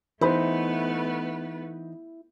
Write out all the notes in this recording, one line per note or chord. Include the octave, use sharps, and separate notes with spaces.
E3 A3 B3 D#4 E4 B4 C5 B5